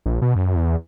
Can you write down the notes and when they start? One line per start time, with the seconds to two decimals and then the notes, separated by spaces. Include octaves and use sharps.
0.06 A#1
0.22 B2
0.36 F#2
0.56 E2